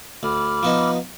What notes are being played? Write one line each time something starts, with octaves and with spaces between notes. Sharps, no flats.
D2 B5 D6 F6
F3 B3 D#4